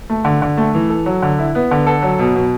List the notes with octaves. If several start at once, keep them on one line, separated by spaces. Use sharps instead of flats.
A3
D3
D3
A3
E3
A4
F#3
D3
E4
B3
D3
A4
F#3
B2
B2